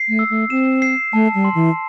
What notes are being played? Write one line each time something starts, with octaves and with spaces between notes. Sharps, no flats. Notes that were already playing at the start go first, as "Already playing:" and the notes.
Already playing: C7
A3
E6
A3
C4 E7
C7
A3 A5
G3
C6
E3